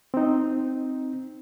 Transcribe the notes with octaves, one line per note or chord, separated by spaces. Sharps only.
C4 D#4